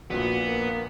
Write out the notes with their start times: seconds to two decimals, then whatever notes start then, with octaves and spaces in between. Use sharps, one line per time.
0.10 A#1 A#2 B3 F#4
0.48 A#3